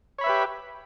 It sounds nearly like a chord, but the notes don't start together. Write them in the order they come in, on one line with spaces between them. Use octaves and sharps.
C#5 B5 E5 B4 G4